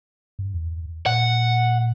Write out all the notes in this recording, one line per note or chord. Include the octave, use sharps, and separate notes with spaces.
G2
E2
A#2 F#5